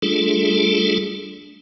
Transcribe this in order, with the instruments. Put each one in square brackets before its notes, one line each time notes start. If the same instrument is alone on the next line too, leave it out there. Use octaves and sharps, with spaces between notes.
[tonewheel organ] G3 A3 D4 F4 G#4 A4